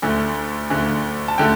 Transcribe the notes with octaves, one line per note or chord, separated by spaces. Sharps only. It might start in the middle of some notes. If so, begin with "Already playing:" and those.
D2 D3 A3
D2 D3 A3
A5
D3 A3 G5